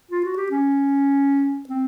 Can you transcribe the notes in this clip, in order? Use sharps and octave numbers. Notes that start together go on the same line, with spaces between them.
F4
F#4
G4
C#4
C4